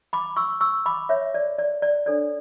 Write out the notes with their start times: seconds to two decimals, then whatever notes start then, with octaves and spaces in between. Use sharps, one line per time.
0.13 B5 D6
0.36 C#6 E6
0.61 C#6 E6
0.86 B5 D6
1.09 C#5 E5
1.34 D5
1.58 D5
1.82 D5
2.06 D4 A4 C#5 D5